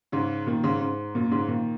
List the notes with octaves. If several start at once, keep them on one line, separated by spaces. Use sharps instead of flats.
G#2 C#3
A#2 D#3
G#2 C#3
G#2
F#2 A#2
G#2 C#3
A#2 D#3